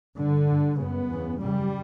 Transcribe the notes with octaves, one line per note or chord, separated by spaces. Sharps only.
G2 D3
G2
F#2 C#3 B3
E2 C#3
F#2 C#3 G3